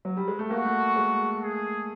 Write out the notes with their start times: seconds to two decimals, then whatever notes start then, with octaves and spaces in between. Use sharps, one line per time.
0.05 F#3
0.17 G3
0.28 G#3
0.39 A3
0.50 A#3 F#4
0.65 A3
0.96 G#3
1.43 G#4